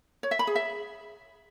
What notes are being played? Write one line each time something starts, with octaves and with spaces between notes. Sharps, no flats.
C#5
E5
B5
G#4
E5